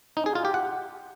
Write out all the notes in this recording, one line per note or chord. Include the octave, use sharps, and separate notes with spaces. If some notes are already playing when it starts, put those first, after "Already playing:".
D#4
G#4
F4
G4
F#5